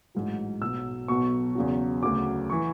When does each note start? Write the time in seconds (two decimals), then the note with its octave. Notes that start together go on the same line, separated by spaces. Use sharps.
0.15 A1 G#2 F#3
0.61 B1 B2 F#3 E6
1.08 B1 B2 F#3 C#6
1.55 E2 C#3 F#3
2.02 D2 C#3 F#3 D6
2.50 E3 C#6